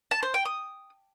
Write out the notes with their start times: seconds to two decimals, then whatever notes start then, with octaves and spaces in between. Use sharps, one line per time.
0.11 A5
0.23 C5
0.34 G5
0.45 D#6